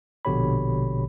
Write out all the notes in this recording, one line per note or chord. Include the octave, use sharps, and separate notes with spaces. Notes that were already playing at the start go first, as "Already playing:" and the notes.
A#1 B2 D3 G4 C#5 B5